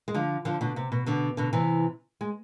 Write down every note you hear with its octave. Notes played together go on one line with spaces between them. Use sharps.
G#3
D3 F3
D3 F3
B2 D3
C3
B2
B2 D3
B2 D3
C3 E3
G#3